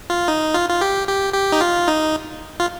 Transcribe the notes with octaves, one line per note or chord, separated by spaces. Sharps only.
F4
D#4
F4
F4
G4
G4
G4
D#4
F4
D#4
F4